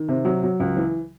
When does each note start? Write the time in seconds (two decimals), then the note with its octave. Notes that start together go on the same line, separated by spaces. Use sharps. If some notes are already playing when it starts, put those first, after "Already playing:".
Already playing: D#3
0.08 C3
0.25 F#3
0.43 F#3
0.60 C#2
0.77 E3